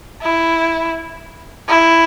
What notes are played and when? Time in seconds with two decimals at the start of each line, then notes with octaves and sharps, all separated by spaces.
0.22 E4
1.68 E4